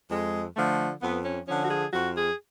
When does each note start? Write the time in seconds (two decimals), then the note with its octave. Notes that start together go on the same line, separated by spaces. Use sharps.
0.10 F2 G#3
0.55 D3 F3 A3
1.01 F2 B3
1.24 C#4
1.47 D3 F3 C#4
1.65 F#4
1.70 G#4
1.93 F2 F#4
2.16 G#4